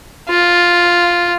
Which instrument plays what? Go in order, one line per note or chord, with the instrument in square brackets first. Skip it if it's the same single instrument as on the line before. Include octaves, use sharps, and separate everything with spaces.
[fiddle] F4